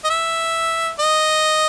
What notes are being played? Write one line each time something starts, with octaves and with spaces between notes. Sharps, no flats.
D#5
E5
D#5